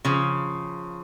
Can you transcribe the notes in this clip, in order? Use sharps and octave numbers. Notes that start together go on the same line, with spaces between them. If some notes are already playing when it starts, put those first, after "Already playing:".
C#3 F3